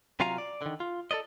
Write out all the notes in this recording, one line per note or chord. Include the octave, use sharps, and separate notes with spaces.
C3 F#3 F4 F5 G#5 A#5
D5
D3 D#3
F4
A4 B4 D5 D#5